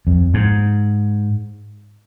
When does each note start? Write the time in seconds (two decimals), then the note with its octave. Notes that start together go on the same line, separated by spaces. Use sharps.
0.07 F2
0.34 G#2